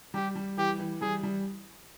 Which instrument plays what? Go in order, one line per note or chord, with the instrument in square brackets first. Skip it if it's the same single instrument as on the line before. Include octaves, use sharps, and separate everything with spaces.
[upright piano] G3 [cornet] G4
[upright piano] G3
[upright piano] E3 [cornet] G4
[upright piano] E3
[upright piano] G3 [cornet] G#4
[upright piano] G3